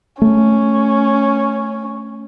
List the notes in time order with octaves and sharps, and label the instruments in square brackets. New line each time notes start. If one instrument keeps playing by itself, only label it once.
[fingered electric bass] A3 [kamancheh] C#4